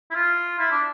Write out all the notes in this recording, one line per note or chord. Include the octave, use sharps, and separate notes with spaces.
E4
F4
E4
D4